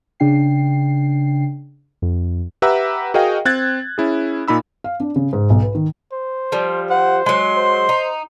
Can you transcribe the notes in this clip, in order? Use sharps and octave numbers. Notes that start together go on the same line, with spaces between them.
C#3 D4 G5 C7
F2
G4 B4 E5 F#5 A#5 E6
F#4 G#4 A#4 D#5 F5 G5
C4 F#6 G#6 A6
C#4 E4 G#4
A#2 D#4 B5 E6
F5
D4
C#3
G#2
B1
B4
D#3
C5
F3 G3
C5 F#5
F#3 G#3 C6
C5
D#4